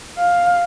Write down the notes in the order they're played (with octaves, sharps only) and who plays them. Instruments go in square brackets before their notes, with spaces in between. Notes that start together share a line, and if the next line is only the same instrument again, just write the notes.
[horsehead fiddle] F5